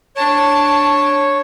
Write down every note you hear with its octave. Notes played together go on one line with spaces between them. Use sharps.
D4 C#5 A5